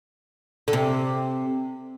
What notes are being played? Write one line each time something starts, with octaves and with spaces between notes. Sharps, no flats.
D3
C3